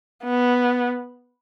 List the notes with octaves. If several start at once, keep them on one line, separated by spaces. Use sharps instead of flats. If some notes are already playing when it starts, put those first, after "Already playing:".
B3